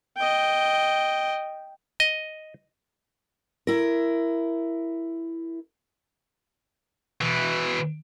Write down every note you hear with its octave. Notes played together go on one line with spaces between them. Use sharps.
D#5 G5
D#5
E4 A#4
B2 E3